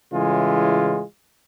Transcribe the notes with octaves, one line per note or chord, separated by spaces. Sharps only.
A2 C#3 E3 G#3 F4